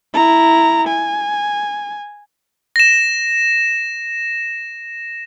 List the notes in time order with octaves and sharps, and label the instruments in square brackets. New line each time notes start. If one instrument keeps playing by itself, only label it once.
[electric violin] E4 A#5
G#5
[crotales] A#6 E7